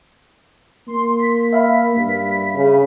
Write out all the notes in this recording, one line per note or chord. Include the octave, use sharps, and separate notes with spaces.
A#3 C6
B6
E5 F5 B5
G2
C#3